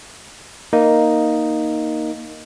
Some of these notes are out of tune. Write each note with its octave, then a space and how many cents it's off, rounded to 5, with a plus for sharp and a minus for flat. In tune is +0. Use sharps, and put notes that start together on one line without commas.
A#3 +0 D#4 +0